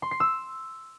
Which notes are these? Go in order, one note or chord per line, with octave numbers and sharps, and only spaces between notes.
C6
C7
E6